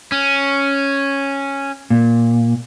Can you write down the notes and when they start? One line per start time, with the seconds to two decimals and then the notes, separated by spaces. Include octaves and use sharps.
0.12 C#4
1.90 A#2